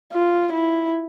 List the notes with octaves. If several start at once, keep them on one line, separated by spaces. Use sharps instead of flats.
F4
E4